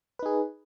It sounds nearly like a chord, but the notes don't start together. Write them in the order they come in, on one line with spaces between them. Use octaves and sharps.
B4 D#4 G#4